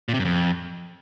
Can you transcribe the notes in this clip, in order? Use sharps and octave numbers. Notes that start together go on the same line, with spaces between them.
A#2
C3
F#2
F2